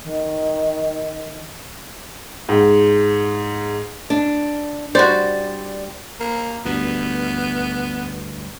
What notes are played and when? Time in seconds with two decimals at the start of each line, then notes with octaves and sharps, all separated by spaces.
0.03 D#3
2.49 G#2
4.10 D4
4.95 G3 F#4 C5 D5
6.20 A#3
6.65 D2 G2 B3